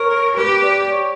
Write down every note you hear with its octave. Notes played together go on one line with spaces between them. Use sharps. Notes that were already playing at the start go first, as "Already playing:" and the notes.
Already playing: A#4 C#5
G4 B4
D5
C#5